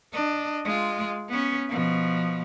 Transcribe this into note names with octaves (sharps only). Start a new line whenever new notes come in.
D4 D#5
G#3 F4
B3 C#4
B2 F3